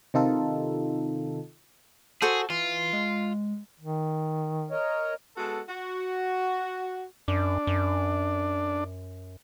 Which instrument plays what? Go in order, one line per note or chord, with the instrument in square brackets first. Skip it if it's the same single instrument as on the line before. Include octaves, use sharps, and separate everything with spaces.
[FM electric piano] C3 D#3 D#4 F4 A4
[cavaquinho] F#4 A4 C5 [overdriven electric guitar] G#4
[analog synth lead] E3 [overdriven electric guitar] F4 [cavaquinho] C6
[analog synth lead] G#3
[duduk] D#3
[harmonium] A#4 C#5 D#5
[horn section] G#3 B3 F#4 A4
F#4
[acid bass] F#2 [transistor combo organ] D4
[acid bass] F#2